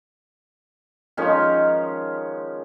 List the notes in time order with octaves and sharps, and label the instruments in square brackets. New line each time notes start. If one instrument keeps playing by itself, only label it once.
[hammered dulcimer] D#3 F3 G#3 C#4